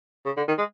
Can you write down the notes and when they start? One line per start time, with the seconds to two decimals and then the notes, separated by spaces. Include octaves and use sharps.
0.26 C#3
0.37 D3
0.48 D#3
0.58 G#3